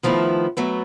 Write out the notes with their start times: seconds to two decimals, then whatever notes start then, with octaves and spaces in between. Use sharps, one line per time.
0.03 D#3 F3 A3 B3 E4
0.57 F#3 A3 B3